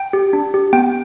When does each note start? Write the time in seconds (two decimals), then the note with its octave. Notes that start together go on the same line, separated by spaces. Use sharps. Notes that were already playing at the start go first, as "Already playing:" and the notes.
Already playing: G5
0.13 G4
0.33 D4
0.54 G4
0.73 B3 G5